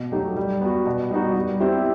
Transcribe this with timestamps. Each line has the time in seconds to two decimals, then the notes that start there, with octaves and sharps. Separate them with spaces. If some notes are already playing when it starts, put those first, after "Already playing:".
Already playing: B2
0.12 F#3 A3 D#4 G4
0.36 G3
0.61 B3 F#4
0.86 B2
1.10 G3 B3 D#4 F#4
1.36 G3
1.60 C4 E4 G4